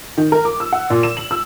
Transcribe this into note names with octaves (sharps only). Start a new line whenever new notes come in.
D#3
A#4
D6
E6
F#5
A#2
E7
F#7
E6